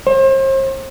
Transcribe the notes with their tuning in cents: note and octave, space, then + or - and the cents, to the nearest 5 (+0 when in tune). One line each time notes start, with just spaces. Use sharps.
C5 +40